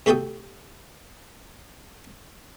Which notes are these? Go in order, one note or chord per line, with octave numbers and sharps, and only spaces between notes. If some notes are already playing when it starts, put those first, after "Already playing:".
C3 A3 F#4 A4 G5 D#6